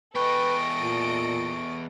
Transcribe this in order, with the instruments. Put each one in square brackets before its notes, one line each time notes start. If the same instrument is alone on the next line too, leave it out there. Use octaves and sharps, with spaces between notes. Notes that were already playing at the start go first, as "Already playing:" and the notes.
[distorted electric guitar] E2 G5 [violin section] A4 D#5 D7 [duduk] B4 [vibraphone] C#6
[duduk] A#2